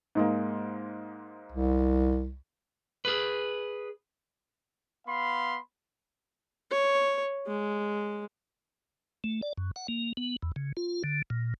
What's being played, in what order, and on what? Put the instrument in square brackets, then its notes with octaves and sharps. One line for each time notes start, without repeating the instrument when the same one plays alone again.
[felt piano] G#2 G#3 A#3
[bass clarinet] C2
[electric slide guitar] G#4 B4
[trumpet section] B3 F5 B5 C6
[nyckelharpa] C#5
G#3
[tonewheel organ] A3
D5
F#2
F#5
A#3
B3
E2
C#3
F4
D3
A#2